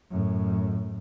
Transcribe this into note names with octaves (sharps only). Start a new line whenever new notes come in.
F#2 A2